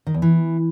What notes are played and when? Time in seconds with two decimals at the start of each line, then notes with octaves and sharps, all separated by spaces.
0.07 D#3
0.14 E2
0.22 E3